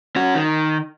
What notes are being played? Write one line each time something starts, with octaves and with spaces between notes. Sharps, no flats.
C#4 F#4
D#3